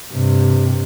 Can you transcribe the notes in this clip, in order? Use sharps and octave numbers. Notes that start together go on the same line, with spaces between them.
G2 C3